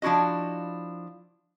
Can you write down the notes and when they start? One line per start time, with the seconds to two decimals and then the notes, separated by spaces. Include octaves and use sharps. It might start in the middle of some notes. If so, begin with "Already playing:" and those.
0.02 F3 D4 E4 F#4 D#5